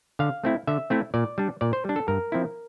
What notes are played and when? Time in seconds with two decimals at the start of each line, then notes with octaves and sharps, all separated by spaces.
0.19 D3 F5
0.44 A3 C4 E4
0.67 D3 E5
0.90 A3 C4 E4
1.14 A#2 D5
1.38 G3 D4
1.61 A#2 D5
1.73 C5
1.85 G3 D4
1.96 A4
2.08 G2 A#4
2.32 F3 C4 E4